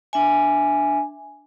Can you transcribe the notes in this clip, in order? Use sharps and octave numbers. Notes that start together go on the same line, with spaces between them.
D4 E5 G#5